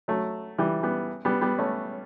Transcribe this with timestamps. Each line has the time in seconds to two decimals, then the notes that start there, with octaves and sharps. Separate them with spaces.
0.08 F#3 A3
0.58 E3 G3
0.83 G3 B3
1.25 G3 B3
1.41 G3 B3
1.58 A3 C#4